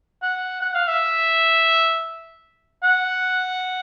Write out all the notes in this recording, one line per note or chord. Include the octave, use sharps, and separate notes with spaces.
F#5
F#5
F5
E5
F#5